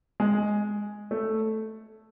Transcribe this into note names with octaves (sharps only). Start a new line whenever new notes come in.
G#3
A3